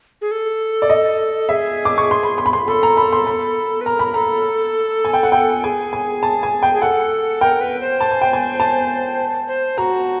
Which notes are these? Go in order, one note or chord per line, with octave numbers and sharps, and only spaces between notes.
G#4
A4
D5
D#5
G#4 E5
D6
C#6
C6
B5
C6
B5
C6
A4 B5
A#5
B5
C6
B5
B4
A#4 A#5
B5
A4 A#5
G#5
G5
F#5
G5
G#4 G#5
G#5
A5
G#5
G5
G#4
A4 F#5
A#4 G5
B4
C5
A5
G#5
G5
G#5
A5
C5
F#4 A#5